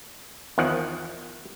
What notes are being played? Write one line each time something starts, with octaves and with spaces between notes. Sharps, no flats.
E2 D#3 F3 F#5